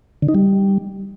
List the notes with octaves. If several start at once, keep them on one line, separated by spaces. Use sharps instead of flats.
D3
D#4
G3